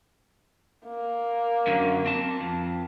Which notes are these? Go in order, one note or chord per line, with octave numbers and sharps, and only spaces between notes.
A#3
F#2 D3 F#3
C4 A5
F2